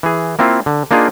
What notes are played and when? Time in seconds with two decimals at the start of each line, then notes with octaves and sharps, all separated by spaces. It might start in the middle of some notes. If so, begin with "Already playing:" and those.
0.03 E3 G#4
0.39 A#3 C4 E4 F4
0.66 D3
0.91 A#3 D4 D#4 F4 G#4